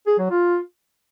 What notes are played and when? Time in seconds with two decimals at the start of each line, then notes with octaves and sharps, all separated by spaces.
0.07 G#4
0.19 F#3
0.30 F4